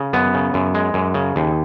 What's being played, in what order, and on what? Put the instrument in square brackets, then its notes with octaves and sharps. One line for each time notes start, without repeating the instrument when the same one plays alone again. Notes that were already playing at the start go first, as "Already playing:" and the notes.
Already playing: [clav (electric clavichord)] C#3
F#2 B3
C#3
F#2
G#3
F#2
C#3
D#2